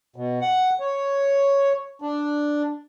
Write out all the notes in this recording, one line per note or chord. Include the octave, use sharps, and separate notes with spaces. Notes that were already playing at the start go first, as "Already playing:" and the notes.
B2
F#5
C#5
D4